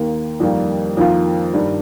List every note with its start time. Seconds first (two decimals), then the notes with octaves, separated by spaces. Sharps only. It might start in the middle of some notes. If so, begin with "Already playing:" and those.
Already playing: D#2 D#3 A#3
0.40 F2 D#3 G3 A#3
0.97 F2 D#3 A#3 F4
1.53 G2 D#3 G3